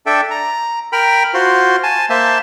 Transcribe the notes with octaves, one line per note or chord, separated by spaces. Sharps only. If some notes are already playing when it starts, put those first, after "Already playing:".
D4 A4 E5 G5
A#5
A#4 G5 B5 F6
F4 F#4 C5
G#5 A5
A#3 C5 E5 A5